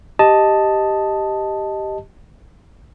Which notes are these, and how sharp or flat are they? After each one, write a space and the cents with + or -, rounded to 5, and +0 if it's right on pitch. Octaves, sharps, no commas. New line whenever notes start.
G4 +0 D#5 +0 A5 +0